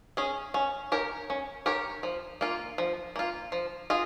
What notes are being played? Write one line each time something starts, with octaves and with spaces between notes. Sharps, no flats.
C#4 G#4
C#4
G4 A#4 C#5
C#4
G4 A#4 C#5
F3
A#3 F4
F3
A#3 F4
F3
F4 G#4 D#5